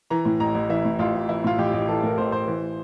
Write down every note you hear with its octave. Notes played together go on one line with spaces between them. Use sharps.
E3 A#5
A2
A1 A#5
A1
E3 E5
A2
A1 F4
A1
E3 E4
A2 F4
A1 G4
A1
E3 A4
A2 A#4
A1 C5
A1 C5
E3